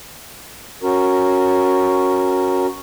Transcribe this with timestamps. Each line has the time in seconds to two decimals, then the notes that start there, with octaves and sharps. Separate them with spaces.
0.83 C#4 F#4 A#4